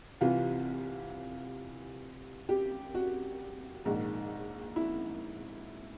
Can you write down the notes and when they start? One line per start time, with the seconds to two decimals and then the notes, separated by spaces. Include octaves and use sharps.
0.21 C2 C3 E3 F4
2.49 G4
2.94 F#4
3.85 A#1 G#2 D#3
4.76 E4